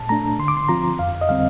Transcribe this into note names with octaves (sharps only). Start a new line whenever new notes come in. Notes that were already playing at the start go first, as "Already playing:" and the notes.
Already playing: A#2 A5
A3 D4 A#5
D3 C6
D6
C6
F3 C4 F4 A#5
F2 F5
D#5
D3 G3 C4 F5